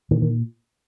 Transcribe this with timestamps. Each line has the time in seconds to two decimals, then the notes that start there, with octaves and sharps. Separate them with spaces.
0.11 A#2 D#3
0.22 D#3